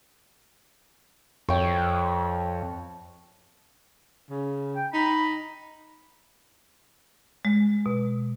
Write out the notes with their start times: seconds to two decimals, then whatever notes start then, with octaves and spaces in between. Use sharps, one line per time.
1.49 F2 C#5 G5
4.30 C#3
4.76 G5
4.93 D#4 B5
7.45 G#3
7.86 B2